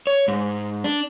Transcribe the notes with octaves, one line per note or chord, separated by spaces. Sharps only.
C#5
G#2
D4